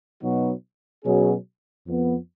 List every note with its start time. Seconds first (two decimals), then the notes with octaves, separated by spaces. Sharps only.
0.22 B2 F#3 B3 D#4 F#4
1.04 B2 F#3 C#4 G#4
1.87 F2 F3 B3